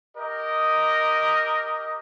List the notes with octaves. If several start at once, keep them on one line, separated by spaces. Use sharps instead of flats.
G4 A#4 D#5